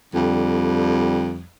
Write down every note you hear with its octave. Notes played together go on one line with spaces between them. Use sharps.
F2 D3 G3